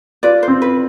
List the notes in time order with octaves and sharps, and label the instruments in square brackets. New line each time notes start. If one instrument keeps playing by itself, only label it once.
[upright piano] F4 [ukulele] B4 D5
[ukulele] C5
[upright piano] C4
[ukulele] B4